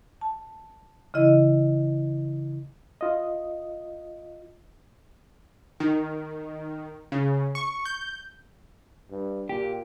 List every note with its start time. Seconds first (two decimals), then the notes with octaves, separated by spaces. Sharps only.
0.21 A5
1.14 C#3 E3 E4 D#5
3.01 F4 D#5
5.80 D#3
7.12 C#3
7.55 C#6
7.86 G6
9.11 G2
9.49 A#2 G4